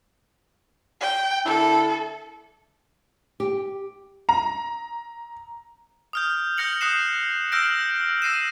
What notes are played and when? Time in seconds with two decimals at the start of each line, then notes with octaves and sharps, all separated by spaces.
1.01 G5
1.46 D3 A#3 E4 A4
3.40 G4
4.29 A#5
6.13 D#6 F6 G6
6.57 F6 G6 A#6 C#7 F#7
6.81 D#6 F#6 C7 E7
7.52 E6 F6 G6 A#6 D7
8.22 E6 A#6 C7 D#7 E7